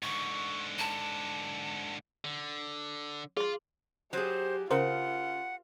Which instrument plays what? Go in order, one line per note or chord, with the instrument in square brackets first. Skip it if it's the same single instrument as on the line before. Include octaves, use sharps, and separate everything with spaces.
[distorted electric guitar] G#2 D3 [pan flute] C#6
[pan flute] A5
[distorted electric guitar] D3
[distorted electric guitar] F4 [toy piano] G#4 C6
[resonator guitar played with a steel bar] F#3 G#4 [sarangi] G4 [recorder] C5
[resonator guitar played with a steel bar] C#3 [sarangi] F4 [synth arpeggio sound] A#4 C5 [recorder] F#5